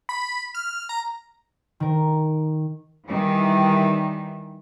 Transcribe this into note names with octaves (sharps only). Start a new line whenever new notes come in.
B5
F6
A#5
D#3 A#4
D#3 E3 G3